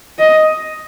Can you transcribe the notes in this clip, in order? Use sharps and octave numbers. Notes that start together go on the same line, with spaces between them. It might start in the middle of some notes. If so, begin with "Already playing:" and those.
D#5